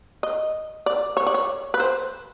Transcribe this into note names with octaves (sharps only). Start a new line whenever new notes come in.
D#5
D5
C#5
D5
C#5
B4
C5